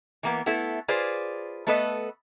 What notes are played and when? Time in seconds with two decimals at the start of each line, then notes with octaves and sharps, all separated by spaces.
0.23 E3 A#3 B3
0.46 A3 B3 E4 A4
0.88 F4 G#4 B4 C5 D5
1.67 A3 B3 A4 B4 D#5